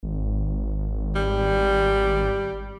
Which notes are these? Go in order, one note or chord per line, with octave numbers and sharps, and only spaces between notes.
G#1
G3